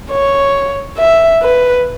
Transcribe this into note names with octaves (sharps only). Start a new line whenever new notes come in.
C#5
E5
B4